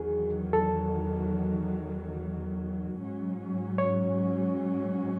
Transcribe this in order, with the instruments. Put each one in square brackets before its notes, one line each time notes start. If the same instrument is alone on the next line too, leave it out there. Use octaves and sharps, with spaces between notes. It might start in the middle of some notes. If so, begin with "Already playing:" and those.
Already playing: [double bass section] E2 D#3 F#3 [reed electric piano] G#4
[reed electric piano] A4
[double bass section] G#2 F#3 C#4
[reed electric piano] C#5